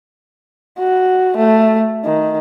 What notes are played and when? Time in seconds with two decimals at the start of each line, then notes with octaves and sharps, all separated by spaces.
0.79 F#4
1.37 A3
2.04 D#3